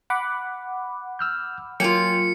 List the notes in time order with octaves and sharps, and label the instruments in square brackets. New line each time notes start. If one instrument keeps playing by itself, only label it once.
[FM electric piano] F#5 B5 D6
[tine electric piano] E6 F6 G6
[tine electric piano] F#3 [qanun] A#3 F4 [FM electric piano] G5 G#5 [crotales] C#7